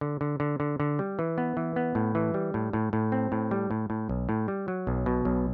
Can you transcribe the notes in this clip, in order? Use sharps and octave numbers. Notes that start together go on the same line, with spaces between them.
D3
D3
D3
D3
D3
G3
E3
B3
E3
B3
A2
E3
G3
A2
A2
A2
C4
A2
G3
A2
A2
B1
A2
G3
F#3
B1
B2
B1